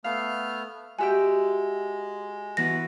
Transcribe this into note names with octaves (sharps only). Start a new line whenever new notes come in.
A3 B3 F5 F6
G#3 F#4 G4 E5 G5 G#5
E3 B3 F#4 B4 A#6